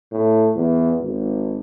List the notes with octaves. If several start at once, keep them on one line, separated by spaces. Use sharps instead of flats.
A2
E2
G#1